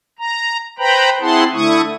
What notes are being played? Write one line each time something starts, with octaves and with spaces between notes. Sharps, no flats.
A#5
B4 C5 G5 A#5 B5
C4 E4 G#4 F#5 A5 C6
D3 A3 E4 C#6 D#6